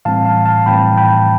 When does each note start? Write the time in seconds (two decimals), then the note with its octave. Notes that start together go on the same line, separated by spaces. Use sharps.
0.05 A2 E3 G3 C4 F5 A5
0.25 F5 A5
0.46 F5 A5
0.66 A2 E3 G3 C4 G5 B5
0.97 G5 B5